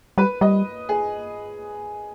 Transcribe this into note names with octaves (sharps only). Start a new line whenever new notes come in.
G3 B4
G3 D#5
G#4